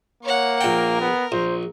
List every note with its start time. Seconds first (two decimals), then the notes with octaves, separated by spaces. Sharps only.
0.23 A#3 C#5 F#5
0.61 A#1 A#4 G5
1.01 B3
1.32 A#1 C5